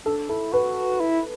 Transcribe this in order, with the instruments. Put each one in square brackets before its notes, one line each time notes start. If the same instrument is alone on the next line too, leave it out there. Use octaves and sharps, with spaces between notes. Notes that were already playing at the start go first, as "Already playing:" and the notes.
[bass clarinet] D4 [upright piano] A4
[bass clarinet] E4 [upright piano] A4
[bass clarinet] F#4 [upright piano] B4
[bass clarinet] E4